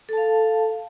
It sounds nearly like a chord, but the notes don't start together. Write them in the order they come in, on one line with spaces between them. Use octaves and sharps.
A4 A5 F5